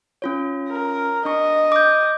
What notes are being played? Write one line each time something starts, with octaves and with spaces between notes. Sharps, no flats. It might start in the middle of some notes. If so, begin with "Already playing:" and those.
C#4 F4 C#5
A#4
D4 D#5 C#6
D6 G6